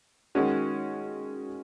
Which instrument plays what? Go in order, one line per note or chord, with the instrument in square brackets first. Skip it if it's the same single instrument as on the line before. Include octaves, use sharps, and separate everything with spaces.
[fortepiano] D#3 G#3 C#4 F#4